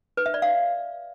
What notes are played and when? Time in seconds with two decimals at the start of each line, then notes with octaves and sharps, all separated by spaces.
0.17 B4
0.26 E5
0.34 D5
0.42 F5